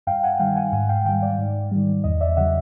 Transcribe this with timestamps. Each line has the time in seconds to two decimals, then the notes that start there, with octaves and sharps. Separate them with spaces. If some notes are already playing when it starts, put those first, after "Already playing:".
0.07 G2 F5 G5
0.23 F#5 G#5
0.39 D#3 G3 F5 G5
0.56 F#5 G#5
0.72 G#2 F#5 G#5
0.89 F5 G5
1.05 D#3 G3 F5 G5
1.22 D5
1.38 G#2
1.71 D#3 G3
2.04 E2 D#5
2.20 D5 E5
2.37 C#3 F#3 E5 F#5